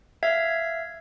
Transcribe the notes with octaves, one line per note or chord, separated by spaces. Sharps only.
E5 F5 G#6 B6